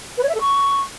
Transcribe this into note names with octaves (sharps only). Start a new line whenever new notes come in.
B4
C#5
E5
A4
C#6